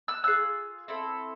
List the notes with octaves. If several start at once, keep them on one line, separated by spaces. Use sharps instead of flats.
E6 F#6
C4 F4 G#4 E6 F#6
C4 E4 A4